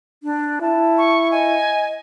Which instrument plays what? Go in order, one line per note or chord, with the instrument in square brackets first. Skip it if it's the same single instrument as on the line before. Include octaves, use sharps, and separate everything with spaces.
[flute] D4
[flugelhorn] E4 [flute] A5
[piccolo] C#6
[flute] D#5 [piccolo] G#5